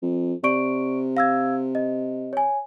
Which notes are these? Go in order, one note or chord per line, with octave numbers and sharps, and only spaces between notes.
F2
C3 D5 C#6 D7
F5 E6 G#6
D#5
C#5 G#5